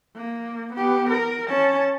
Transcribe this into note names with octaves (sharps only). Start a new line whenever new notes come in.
A#3
B3 G4
A#4
C#4 A5